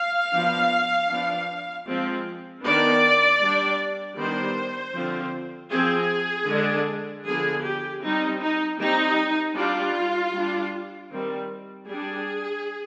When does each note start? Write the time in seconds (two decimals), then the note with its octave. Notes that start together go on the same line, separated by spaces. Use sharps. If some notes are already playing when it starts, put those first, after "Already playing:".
Already playing: F5
0.32 F3 B3 D4
1.10 F3 B3 D4
1.87 F3 G#3 C4
2.63 D#3 B3 D4 D5
3.41 G3 D4
4.18 D#3 G3 B3 D4 C5
4.95 D3 F3 C4
5.72 F3 C4 G#4
6.49 D3 G#3 D4
7.26 D3 F3 B3 G#4
7.65 G4
8.03 G3 C4 D#4
8.41 D#4
8.80 G3 C4 D#4
9.57 G3 D4 F4
10.34 G3 D4
11.11 D#3 G3 C4
11.88 G3 D4 G#4